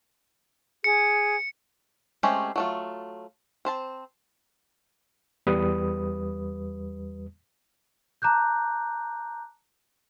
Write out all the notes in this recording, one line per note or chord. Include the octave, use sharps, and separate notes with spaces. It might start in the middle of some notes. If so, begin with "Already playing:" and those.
G#4 C#7
G#3 A3 C4 C#4 G4
F#3 A3 F4
C4 C5 A5
E2 G3 B4 D#6
A5 A#5 D6 F#6 G6